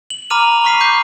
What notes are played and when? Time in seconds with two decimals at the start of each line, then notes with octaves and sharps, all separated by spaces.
0.10 F#7
0.30 A#5 B5 D6 F6 D#7 F7
0.64 C#6 D6 F6 B6 C7 D#7
0.80 D6 G6 C7